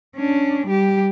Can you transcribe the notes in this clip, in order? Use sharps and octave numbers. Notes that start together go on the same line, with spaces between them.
C#4 D4
G3 G4